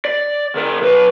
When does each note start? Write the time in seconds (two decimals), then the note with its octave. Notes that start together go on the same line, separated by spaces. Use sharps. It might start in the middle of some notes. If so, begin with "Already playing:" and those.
0.05 D5
0.55 C#3 A#4
0.81 B1 B4